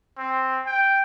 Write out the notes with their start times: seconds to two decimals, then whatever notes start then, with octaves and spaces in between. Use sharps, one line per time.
0.18 C4
0.66 G5